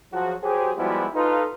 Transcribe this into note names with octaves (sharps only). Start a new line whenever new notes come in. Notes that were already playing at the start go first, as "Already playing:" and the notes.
F3 F#3 F#4 G#4
F#3 G4 G#4 C5
F3 G3 G#3 B3 E4 F#4
D#4 F4 A4 B4